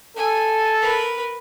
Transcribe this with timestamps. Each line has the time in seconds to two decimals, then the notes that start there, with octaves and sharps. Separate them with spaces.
0.16 A4 G#5
0.81 A#4 B4